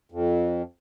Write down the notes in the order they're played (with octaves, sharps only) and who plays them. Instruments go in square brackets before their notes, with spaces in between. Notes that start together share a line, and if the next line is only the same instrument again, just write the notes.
[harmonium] F2